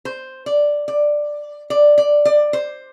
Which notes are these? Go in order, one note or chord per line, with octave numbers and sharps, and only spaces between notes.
C5
D5
D5
D5
D5
D5
C5